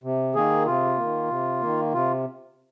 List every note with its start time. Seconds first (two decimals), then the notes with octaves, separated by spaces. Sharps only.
0.04 C3
0.35 D#3 A#3 G#4
0.66 C3 F4
0.98 D#3 A#3
1.30 C3
1.61 D#3 A#3
1.93 C3 F4